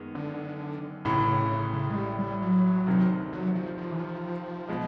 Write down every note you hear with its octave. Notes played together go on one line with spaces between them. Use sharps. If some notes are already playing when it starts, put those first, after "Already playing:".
Already playing: F#2 D#3 G#3 B3
D3
A1 A2 C#3 E3
C#3
C#3
C#3
G#3
G3
G3
F#3
D2 C3 D#3
F#3
F3
F3
E3
F3
B2 G#3